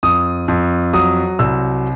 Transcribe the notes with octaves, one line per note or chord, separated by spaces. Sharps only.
F2 D#6
F2
F#3 D#6
C2 E6